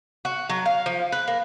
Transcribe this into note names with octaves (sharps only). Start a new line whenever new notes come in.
F#4
F#3
F5
F3
B4
A#3